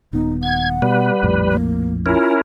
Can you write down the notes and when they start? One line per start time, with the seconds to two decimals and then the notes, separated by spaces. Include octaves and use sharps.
0.13 D#1 D#3 B3 D#4
0.43 F#5 G#6
0.82 B2 G3 B4
1.23 A#1 F2 A2
1.51 A#3
2.06 C#4 E4 F4 A#4